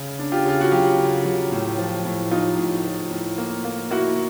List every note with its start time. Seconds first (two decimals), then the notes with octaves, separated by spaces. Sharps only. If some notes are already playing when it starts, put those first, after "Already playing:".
Already playing: C#3
0.19 D4
0.32 F4 G4
0.45 C#3 F4
0.61 F#4
0.72 F#3 F4 G4
0.99 C#3
1.25 F#3
1.52 A2
1.78 F3
2.05 A2
2.31 F3 D#4 F4
2.58 A2
2.84 F3
3.11 A2
3.38 A#3
3.65 A#3
3.91 A#3 E4 F#4